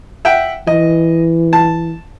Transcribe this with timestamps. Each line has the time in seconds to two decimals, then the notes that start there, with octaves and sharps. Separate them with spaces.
0.25 E5 F#5 G5
0.67 E3 D#5
1.53 A5